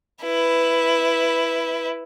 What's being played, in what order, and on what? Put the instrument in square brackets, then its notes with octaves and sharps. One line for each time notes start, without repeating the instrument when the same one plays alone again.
[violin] E4 B4